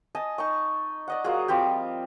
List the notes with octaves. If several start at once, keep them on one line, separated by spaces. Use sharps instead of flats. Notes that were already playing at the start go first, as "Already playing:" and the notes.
D#5 G#5 A5
D#4 A5 C#6
D5 D#5 F#5
F#3 A#3 F4 G#4
F3 G3 C4 G4